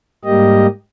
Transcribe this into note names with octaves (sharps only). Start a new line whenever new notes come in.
G#2 G3 A#3 G4 D#5